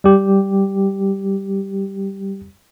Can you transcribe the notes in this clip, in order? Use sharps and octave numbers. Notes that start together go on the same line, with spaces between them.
G3 G4